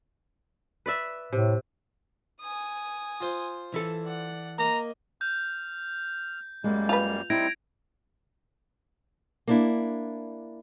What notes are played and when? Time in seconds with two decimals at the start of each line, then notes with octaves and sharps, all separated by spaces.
0.86 B4 D5 E5
1.32 A2 C3
2.40 G#5 D#6
3.20 F4 C5
3.74 E3 A4
4.04 D5 F#5
4.59 A#3 D#5 A#5
5.21 F6 G6
6.64 F#2 G3 G#3 A#3
6.89 F4 B4 F7
7.30 G3 C4 D#4 E4 G#6 A#6 D7
9.47 A#3 D4 E4